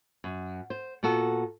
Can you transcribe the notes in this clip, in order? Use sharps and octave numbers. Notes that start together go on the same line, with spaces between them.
F#2
C5
A#2 B3 F#4 A4